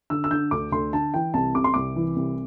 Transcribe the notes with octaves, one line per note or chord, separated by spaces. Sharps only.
D3 E6
E6
D3 G6
D2 D6
D2 C6
D3 A5
E3 G5
C2 A5
C3 D6
C6
C2 D6
E3
C2